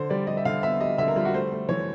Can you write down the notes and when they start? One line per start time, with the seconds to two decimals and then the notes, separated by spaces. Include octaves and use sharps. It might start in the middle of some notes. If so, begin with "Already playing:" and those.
Already playing: D3 C5
0.10 G3 D5
0.27 G3 D#5
0.37 E5
0.45 D3 F5
0.63 B3 E5
0.80 G3 D#5
0.98 D3 E5
1.08 A#4
1.16 G3 F4
1.25 F#4
1.33 A3 C5
1.51 A3
1.69 E3 C#5